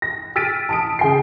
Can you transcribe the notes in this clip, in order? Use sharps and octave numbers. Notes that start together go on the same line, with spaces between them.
A#6
E6 F6 A6 B6 D7 D#7
A5 D#6 D7
C#3 G5 C7